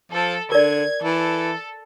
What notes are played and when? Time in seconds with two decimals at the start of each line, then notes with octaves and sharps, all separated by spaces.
0.12 F3 A4
0.52 D3 A#4 D5 G#6
1.04 E3 A4